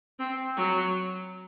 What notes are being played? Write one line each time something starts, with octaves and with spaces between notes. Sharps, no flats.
C4
F#3